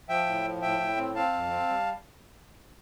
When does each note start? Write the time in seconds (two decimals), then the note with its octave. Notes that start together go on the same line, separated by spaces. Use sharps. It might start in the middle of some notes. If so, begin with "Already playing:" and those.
0.09 F3 E5 G5
0.26 A2
0.45 F3
0.62 A2 E5 G5
0.80 A2
0.97 C4
1.15 C4 F5 A5
1.33 F2
1.50 C4
1.68 G3